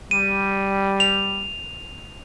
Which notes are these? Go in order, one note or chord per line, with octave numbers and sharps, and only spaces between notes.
G3 D#7
F7